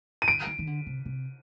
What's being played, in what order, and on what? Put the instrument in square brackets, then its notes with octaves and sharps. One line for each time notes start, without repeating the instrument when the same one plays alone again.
[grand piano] D#7
[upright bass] D3 [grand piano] D7
[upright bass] D#3
D#3
D3
C3
C3